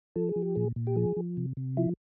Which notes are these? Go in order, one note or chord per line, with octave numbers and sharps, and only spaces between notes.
F3 A4
G#4
F3
G4
A#2 G#4
A#2
G4
F3 G#4
F3
C3
C3
F3 E4